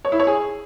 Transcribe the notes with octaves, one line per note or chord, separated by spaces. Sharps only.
C#5
E4
C#5
G#4